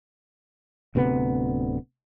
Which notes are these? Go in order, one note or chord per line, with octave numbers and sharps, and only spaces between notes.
D1 D2 C3 B3